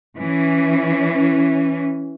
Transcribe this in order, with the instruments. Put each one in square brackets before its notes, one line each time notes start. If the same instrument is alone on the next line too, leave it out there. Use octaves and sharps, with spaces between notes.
[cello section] E3 C#4